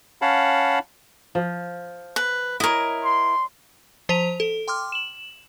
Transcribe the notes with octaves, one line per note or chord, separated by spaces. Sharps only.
C#4 C#5 F5 F#5 A5 B5
F3
B4
E4 A#4 C#5 D#5
C6
F3 C5 A5 B6 D#7 F7
A4
G5 C6 D6 F6
E7 F#7